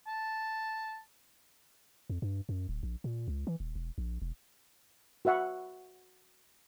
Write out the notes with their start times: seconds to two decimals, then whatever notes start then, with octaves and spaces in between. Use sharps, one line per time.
0.07 A5
2.10 F2
2.22 G2
2.49 F#2
2.69 D1
2.83 A#1
3.04 A#2
3.28 C#2
3.47 E3
3.60 D#1
3.75 E1
3.98 A#1
4.22 E1
5.25 F#4 B4 E5 F#5 C#6